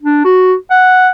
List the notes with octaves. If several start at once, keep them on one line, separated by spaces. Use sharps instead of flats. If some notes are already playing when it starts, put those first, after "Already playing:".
D4
F#4
F#5